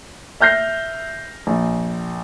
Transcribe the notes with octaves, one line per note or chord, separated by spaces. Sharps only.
E5 F6 G6 A#6 C7
A#1